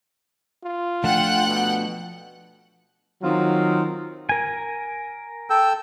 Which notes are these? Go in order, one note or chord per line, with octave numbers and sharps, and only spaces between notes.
F4
F3 A3 D4 F#5 G5 F#6
B2
D#3 F#3 C4 F4
A#4 G#5
A4 G5 E6